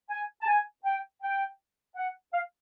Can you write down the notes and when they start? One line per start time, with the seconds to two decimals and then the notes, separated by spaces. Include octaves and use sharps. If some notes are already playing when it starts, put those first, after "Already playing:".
0.10 G#5
0.42 A5
0.47 G#5
0.85 G5
1.22 G5
1.96 F#5
2.33 F5